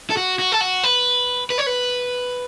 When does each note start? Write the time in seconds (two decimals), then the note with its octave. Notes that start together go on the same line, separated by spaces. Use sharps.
0.10 A4
0.17 F#4
0.39 F#4
0.52 A4
0.61 F#4
0.84 B4
1.50 B4
1.58 C#5
1.67 B4